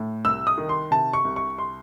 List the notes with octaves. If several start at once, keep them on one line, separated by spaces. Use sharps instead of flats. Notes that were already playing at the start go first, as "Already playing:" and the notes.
Already playing: A2
C2 E6
D#6
D#3
C6
C3 A5
C#6
C2
C#6
C6